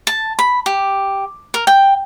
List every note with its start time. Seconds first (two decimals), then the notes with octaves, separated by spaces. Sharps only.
0.07 A5
0.39 B5
0.66 G4
1.54 A#4
1.67 G5